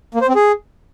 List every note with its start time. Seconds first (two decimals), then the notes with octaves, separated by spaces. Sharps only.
0.15 A#3
0.22 C5
0.28 C4
0.35 G#4